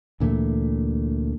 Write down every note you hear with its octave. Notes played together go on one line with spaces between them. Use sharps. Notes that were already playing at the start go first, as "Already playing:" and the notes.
D2 A#2 E3 A3